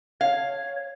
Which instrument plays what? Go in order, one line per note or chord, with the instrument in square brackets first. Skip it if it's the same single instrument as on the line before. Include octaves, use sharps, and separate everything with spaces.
[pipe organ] C#5 [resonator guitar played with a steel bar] F5